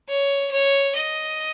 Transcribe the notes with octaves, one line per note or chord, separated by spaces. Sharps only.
C#5
C#5
D#5